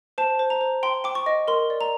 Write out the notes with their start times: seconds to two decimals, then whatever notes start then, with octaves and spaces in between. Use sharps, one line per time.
0.18 C5 A5
0.39 C5
0.50 A#5
0.61 C5
0.83 G5 C6
1.04 G5 D6
1.15 C#6
1.26 D#5
1.48 A#4 C6
1.70 D5
1.81 A#5